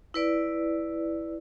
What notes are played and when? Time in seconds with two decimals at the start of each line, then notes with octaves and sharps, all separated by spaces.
0.14 E4 B4 D5